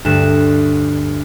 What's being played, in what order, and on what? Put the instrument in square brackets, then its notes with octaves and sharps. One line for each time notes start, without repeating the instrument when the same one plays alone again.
[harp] D2 G2 F#6 E7